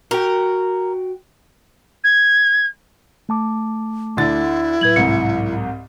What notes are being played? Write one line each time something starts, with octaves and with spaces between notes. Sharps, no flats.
F#4 A#4 G5
G#6
A3 A5 D6
D2 D3 E4 A6
A2 F#3 B4 G#6 F#7
C2 G#2 C#7